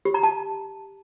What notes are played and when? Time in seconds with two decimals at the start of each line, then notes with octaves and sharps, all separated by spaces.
0.05 G4
0.14 A#5
0.23 A5